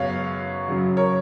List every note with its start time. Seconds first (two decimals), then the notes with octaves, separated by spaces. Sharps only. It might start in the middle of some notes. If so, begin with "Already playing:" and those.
Already playing: F#2 C#3 G#3 B3 C#5 F5
0.68 F#2 C#3 F#3
0.97 A#4 C#5